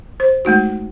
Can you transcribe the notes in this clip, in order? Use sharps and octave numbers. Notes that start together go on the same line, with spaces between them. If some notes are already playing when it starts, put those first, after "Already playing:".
C5
G#3 A3 D#4 F#4